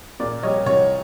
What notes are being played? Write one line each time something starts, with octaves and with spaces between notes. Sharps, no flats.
A#2 D5
G3 C#5 D#5
C2 C#5